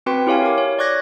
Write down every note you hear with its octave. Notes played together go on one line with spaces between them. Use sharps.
C4 F#4 B4 G5 C6 B6
E4 G4 C#5 F5 G#5
A#4 D6
C#5
D5 C#6 D6 F#6 G#6 A#6